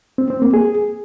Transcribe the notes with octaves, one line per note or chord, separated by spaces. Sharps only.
C4
C4
A#3
G#4